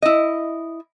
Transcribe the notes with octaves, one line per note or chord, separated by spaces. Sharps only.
E4 D#5